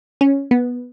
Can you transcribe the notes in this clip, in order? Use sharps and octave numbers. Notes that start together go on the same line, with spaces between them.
C#4
B3